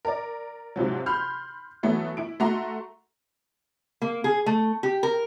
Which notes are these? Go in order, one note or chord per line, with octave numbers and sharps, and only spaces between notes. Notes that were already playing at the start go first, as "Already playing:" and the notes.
A#4 D5
G#2 C3 F3 F#3
B5 C6 F6 G6
E3 F#3 A3 B3
E4 D7
A3 F#4 A#5 C6
A#3
G#4
A3
G4
A#4